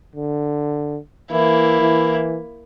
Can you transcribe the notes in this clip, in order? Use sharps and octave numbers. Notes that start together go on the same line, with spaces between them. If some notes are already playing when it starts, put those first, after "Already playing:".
D3
E3 A#3 E4
E3